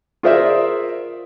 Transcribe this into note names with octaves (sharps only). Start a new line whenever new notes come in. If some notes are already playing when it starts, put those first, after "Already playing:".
F4 G#4 A#4 C5 D5 E5